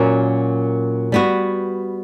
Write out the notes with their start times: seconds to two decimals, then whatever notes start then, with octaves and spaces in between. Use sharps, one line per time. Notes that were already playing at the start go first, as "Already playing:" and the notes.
Already playing: A#2 F#3 C#4 F#4 A#4
1.12 G3 B3 F#4